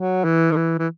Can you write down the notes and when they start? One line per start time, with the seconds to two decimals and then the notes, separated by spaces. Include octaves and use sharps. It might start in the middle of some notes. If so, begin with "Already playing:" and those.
Already playing: F#3
0.24 E3
0.51 D#3
0.56 E3
0.79 E3